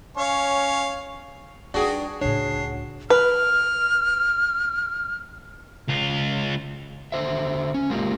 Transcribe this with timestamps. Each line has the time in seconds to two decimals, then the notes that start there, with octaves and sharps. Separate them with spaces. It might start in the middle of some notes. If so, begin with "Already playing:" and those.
0.17 C#4 C#5 F5
1.74 G3 D4 D#4 F#4 G#4 G5
2.21 C#2 A2 D4 C#5 C7
3.10 B4 F6
5.89 C#2 F4
7.12 D3 C5 E5
7.74 C#4
7.90 G#3 A#3 F4 G4